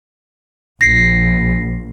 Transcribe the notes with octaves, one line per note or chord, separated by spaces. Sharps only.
A#1 A#6 C7